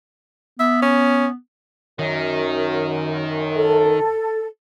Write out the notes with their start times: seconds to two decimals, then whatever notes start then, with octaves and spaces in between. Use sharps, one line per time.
0.60 B3 E5
0.82 C#4
1.99 F#2 D#3
3.56 A4